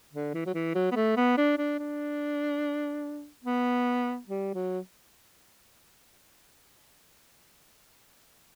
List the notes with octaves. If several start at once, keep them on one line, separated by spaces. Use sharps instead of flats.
D3
E3
F#3
E3
F#3
B3
A3
B3
D4
D4
D4
B3
G3
F#3